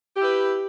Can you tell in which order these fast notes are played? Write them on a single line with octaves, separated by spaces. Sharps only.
G4 E4 B4